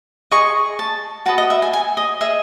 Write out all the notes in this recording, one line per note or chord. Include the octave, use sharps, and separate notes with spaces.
G#4 D#5 C#6
A5
F#4 B4 D#5 A5
D#5
E5
G#5
G#5
D#5
G#4 D#5 E5